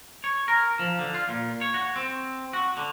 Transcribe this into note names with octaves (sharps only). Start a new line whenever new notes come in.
C#5
A#4
F3
D3
F4
A#2
C#5
F#4
C4
F#4
D3